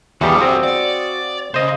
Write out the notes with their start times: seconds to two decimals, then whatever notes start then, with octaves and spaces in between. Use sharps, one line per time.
0.21 E2 G3 F#4 G4 A4 F5 D#6
0.41 C4
0.64 D5
1.54 C#3 C5 D#5